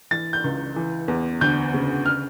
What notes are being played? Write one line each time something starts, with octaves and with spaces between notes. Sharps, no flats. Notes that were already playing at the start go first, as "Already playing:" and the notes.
E3 A6
G6
C#2
E3
E2
D2 G6
C#3
F6